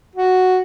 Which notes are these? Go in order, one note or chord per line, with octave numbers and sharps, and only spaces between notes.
F#4